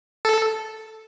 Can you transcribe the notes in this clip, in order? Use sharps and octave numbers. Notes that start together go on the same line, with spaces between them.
A4